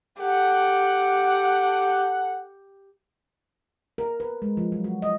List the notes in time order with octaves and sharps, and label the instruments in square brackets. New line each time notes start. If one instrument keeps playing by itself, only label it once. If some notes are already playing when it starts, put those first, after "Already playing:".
[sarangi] G4 [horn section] A4 F#5
[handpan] A#4
B4
G#3
F3
F#3
F#4
D#5